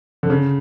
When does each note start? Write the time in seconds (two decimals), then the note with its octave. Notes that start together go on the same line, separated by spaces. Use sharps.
0.23 D3
0.30 C#3